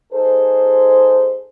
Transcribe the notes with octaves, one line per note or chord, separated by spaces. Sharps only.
D#4 G#4 A4 C5